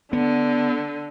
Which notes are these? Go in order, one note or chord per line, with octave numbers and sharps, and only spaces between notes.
D3 B3